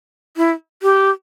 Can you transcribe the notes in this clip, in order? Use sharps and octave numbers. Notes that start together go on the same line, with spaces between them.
E4
G4